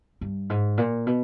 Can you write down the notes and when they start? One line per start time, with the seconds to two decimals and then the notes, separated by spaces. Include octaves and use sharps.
0.21 G2
0.50 G#2
0.78 A#2
1.07 B2